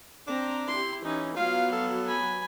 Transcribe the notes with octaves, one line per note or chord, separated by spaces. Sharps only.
C4 D4 A#5
E4 G4 C6
E3 C#4 D#4
F#3 B3 F4 F5
A4
G#5 B5